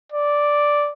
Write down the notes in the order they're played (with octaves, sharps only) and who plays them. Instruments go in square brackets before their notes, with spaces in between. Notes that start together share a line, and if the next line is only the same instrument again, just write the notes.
[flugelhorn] D5